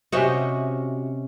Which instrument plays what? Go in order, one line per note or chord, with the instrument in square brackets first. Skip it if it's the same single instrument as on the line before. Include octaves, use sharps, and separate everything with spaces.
[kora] C3 C#4 D#5 [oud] F#4 C5 E5